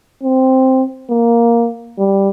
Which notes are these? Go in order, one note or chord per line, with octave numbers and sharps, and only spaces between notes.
C4
A#3
G3